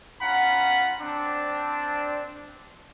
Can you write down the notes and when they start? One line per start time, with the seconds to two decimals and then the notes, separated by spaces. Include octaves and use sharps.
0.21 C#4 F4 F#5 A#5 B5
1.01 C4 D4